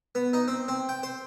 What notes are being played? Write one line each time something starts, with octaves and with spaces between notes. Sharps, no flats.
B3
D#4
C4
C4
G5
C5